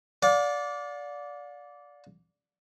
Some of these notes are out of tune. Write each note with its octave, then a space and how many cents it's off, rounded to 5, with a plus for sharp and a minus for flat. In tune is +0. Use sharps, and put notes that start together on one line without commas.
D5 -15 F5 +40